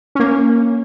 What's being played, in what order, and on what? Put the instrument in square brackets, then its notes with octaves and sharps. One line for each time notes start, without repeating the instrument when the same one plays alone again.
[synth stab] A#3 C#4